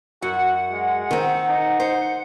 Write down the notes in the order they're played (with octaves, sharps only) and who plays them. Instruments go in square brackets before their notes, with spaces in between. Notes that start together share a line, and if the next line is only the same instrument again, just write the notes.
[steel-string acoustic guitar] F#2 [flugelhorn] F#4 [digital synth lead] F#5
[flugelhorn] G#3
[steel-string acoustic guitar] D#3 C4
[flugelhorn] D#4
[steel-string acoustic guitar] C5